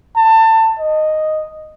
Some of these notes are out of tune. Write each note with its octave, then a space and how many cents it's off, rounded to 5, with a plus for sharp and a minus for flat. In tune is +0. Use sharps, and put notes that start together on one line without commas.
A5 +25
D#5 -5